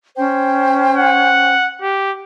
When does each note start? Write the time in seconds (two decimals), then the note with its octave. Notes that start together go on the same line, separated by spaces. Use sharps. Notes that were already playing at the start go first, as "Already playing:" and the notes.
0.17 C#4 C5 G5
0.96 F#5
1.82 G4